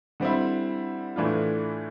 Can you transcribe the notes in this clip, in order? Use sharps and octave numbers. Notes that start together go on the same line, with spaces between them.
D3 G3 C4 E4
A2 E3 A3 D4 F4